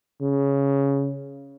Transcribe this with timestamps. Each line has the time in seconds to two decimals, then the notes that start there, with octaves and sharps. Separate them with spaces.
0.21 C#3